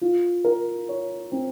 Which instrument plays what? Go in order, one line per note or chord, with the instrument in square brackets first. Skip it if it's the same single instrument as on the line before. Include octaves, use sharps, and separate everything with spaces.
[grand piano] F4
A#4
C#5
C4